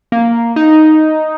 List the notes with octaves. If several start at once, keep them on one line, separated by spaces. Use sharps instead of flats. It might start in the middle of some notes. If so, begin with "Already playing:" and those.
A#3
D#4